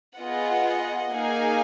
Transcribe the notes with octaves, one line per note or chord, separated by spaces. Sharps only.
B3 F4 G#4 D#5 F#5
A#3 D#4 G#4 F5 G#5